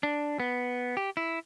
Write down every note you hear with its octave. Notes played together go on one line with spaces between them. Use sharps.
D4
B3
G4
E4